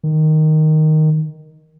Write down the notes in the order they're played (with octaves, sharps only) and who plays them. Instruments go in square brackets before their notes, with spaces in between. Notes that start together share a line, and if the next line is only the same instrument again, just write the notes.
[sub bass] D#3